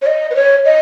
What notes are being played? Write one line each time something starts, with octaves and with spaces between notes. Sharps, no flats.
C#5
D#5
B4
C#5
D#5